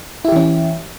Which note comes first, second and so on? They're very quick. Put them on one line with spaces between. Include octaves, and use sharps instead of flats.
E4 G4 E3 C#4